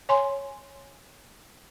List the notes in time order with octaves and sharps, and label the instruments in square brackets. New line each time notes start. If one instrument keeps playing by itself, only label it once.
[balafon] C#5 G#5 C6